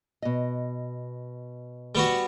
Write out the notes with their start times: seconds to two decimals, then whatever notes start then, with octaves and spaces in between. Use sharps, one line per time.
0.22 B2 D#5
1.95 G3 B3 F#4